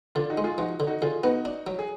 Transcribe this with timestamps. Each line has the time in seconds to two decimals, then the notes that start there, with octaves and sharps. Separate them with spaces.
0.15 D3 D4 F4
0.30 D#4 F#4
0.38 G#3
0.44 F4 G#4
0.58 F3 D#4 F#4
0.80 D3
0.87 D#4 F#4
1.01 D3 F4 G#4
1.23 B3 D#4 F#4
1.45 D4
1.67 F#3
1.79 G#4